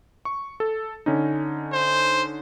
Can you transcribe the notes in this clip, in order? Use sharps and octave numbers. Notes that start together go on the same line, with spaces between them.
C#6
A4
D3 C#4 D#4
C5